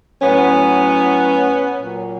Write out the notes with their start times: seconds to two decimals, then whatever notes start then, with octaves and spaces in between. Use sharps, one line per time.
0.21 A2 F#3 B3 C#4
1.78 A#2 F#3